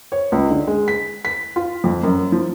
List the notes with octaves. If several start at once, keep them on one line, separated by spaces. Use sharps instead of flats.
C#5
C#2
D3
G#3
B6
B6
F4
F2
F#2
F3